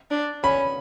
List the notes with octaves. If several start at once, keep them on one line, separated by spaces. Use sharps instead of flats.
D4
C#4 B5